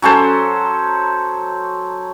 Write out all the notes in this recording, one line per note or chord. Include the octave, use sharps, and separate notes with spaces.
F#3 C#4 A4 C5